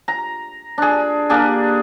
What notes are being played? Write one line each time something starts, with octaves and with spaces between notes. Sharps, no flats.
A#5
D4 G#4
A#3 D4 G4 G#4